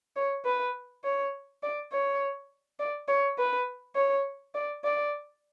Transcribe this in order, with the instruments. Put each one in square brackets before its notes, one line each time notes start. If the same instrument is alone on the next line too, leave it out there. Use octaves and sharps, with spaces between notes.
[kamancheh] C#5
B4
C#5
D5
C#5
D5
C#5
B4
C#5
D5
D5